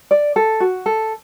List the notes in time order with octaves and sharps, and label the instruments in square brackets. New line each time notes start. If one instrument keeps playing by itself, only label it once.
[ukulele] D5
A4
F#4
A4